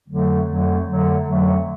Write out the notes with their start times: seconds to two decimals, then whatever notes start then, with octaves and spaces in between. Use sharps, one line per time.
0.08 F2 D3 F#3 A3
0.47 F2 D3 F#3 A3
0.86 F2 D3 F#3 A3
1.25 F2 D3 F#3 A3